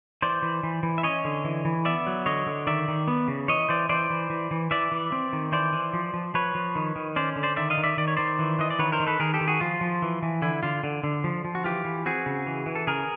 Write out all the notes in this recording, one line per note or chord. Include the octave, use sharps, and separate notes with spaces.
E3 C5 D5
E3
E3
E3
E5
C#4 C#5 D#5
D3
E3
E3
B3 D5 E5
F#3
D3 C#5 D#5
D3
D#3 D5 E5
D#3
B3
C#3
E3 C#5 D#5
E3 C5 D5
E3 C5 D5
E3
E3
E3
E3 D5 E5
E3
C4
D#3
E3 C5 D5
E3
F3
F3
F3 B4 C#5
F3
D#3
D#3
C#4 C5 D5
D3
C5 D5
D#3 D5 E5
D#5 F5
D#3
D5 E5
D#3 D5
C#5
D#3 C5 D5
E3
E3 D#5
D5
D#3 B4 C#5
A#4 C5
D#3
A4 B4
D#3 G#4 A#4
G4 A4
D#3
F#4 G#4
F3 F4
F3
E3
E3
D3 E4
D3 F4
D3
D3
F3
F3
F#4
E3 F4 G4
E3
C4 F#4 G#4
C#3
E3
E3
A4
C#3 G#4 A#4